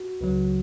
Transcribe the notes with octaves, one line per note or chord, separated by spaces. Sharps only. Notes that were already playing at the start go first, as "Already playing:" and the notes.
Already playing: F#4
C#2 C#3 F#3